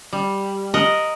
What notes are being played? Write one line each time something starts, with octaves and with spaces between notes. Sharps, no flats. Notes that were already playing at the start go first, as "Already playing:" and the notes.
G3
A#4 D#5 F#5